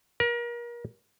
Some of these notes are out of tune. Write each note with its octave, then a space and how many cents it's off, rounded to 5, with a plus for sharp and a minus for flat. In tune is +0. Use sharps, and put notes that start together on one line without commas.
A#4 +35